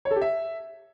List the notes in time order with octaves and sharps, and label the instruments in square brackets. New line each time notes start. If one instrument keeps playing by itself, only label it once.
[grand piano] C#5
A4
G4
E5